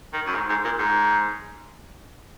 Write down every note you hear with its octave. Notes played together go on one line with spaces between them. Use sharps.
D#3
F#2
G#2
G#2
A#2
G#2